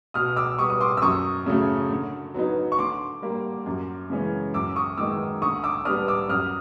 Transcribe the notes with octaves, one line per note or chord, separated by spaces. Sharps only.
B2 D#6 F6
D6 E6
G3 B3 C#6 D#6
D#6
C6 D6
E6
F#2 C#6 D#6
C#3 F#3 A3
D3
F#3 B3 D#4
C#6
D3 C6 D6
G3 A#3
F#2
C#3 E3 G#3 C#4
F#2 D6 E6
C#6 D#6
D#3 G#3 B3 D#4 D6 E6
D3 C#6 D#6
D6 E6
G3 B3 D4 D#6 F6
D6 E6
F#2 D#6 F6